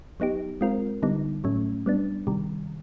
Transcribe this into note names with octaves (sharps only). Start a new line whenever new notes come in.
F#3 B3 D#4 G4
G#3 C4 F4 A#4
D3 G3 B3 D#4
A2 F#3 A3 C#4
G3 B3 D4
C3 D#3 G3